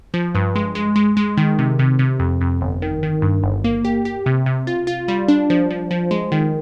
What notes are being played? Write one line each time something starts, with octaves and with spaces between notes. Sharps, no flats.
F3
G2
G#3
G#3
G#3
G#3
D#3
C3
C3
C3
F2
F2
G1
D#3
D#3
G2
G1
A#3
G4
G4
C3
C3
F4
F4
G3
D4
F3
F3
F3
G#3
D#3